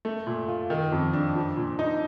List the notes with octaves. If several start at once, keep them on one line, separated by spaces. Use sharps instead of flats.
A3
A#2
F4
D#3
F2
D4
F3
A#2
D#4